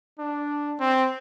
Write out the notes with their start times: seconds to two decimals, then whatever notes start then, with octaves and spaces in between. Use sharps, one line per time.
0.19 D4
0.80 C4